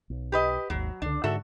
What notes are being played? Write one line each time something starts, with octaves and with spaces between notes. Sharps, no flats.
B1
G4 B4 D#5
G#1 D#2 F#3
C#2 D3 D4
G#2 D3 F#4 A4 E5